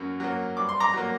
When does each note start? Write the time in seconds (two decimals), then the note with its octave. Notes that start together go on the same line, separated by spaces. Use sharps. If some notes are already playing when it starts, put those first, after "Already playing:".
Already playing: F#2 F#3 A#3
0.20 F#3 A#3
0.57 G2 D6
0.69 C6
0.80 A#5 D6
0.93 F#3 A#3